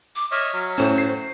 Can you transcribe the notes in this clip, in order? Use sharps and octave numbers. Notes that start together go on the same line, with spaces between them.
D6
C#5 D#5 E5 F6
F#3
A2 C#4 C5
C7